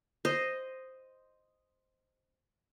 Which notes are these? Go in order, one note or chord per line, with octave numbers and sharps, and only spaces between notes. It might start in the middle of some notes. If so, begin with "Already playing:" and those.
C5 D#5